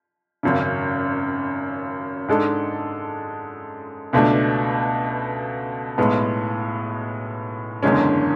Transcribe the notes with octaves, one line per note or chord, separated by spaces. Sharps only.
G#1 F#2 C#3
G#2 G#3 D4 A4
C#2 B2 A3 D4
B1 A2 G#3 B3
F#1 E2 D3 G#3 C#4